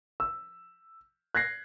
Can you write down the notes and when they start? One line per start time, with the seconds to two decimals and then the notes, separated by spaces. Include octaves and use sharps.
0.20 E6
1.35 F#6 G#6 A#6 C7